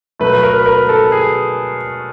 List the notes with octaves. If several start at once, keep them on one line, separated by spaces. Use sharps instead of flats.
B2 F#3 A3 B4
A#4
B4
A#4
A4
G#4